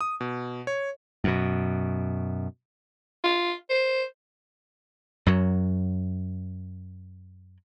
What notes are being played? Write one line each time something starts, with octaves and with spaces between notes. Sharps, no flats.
D#6
B2
C#5
F#2 B2
F4
C5
F#2 F#3